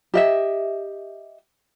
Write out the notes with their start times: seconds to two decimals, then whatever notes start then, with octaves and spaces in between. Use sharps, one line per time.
0.14 G4 D#5 E5